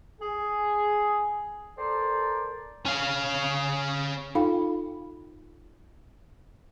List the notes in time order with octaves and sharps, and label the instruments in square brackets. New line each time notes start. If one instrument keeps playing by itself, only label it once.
[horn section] G#4
A4 A#4 C5 D5
[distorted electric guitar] C#4 F5
[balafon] D#4 F4 A4 F5 G5 B5